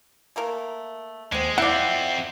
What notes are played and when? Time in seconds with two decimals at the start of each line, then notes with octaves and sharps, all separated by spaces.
0.36 A3 A#3 A#4
1.32 D#2 D3 G#3 C4
1.58 F2 C4 E4 D5 E5 F#5 G6